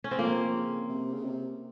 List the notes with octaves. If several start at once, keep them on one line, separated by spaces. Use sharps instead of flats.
C#4
C4
F3 A#3
C#3
C3
C#3
C3